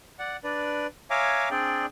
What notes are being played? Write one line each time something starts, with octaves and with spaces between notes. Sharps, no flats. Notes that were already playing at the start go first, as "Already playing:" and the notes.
D5 F#5
D4 B4 D5
C#5 E5 F5 G#5 A#5 D6
C4 D4 G#4 D5 G5